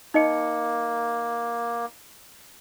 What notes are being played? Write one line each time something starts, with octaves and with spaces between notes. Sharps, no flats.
A#3 D#4 D#5 C#7